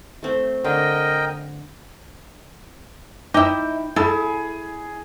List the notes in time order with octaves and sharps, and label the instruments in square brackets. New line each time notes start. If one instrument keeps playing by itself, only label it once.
[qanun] A3 C4
[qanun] D3 [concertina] A#4 D#5 G5
[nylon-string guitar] D#4 E4 [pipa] D#5 E5 [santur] G5 [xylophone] D6
[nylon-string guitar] E4 [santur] G#4 [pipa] A4 [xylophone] E5 B5